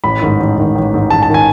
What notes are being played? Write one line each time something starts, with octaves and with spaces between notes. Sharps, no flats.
A1 B5
G#2 D#3
A1
G#2 D#3
A1
G#2 D#3
A1 A5
A5
D#3 G#5